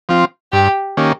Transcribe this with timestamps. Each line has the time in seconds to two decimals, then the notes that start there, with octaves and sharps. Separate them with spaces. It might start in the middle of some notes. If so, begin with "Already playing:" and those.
0.09 F3 C4 F4
0.53 G2 G4
0.97 D#3 A#3 C#4 G4